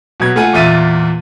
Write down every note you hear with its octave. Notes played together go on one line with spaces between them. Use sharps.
B2 F#3 B3 G#6
A3 F4 F#5 G#5
E2 A#2 F4 E5 A6 D#7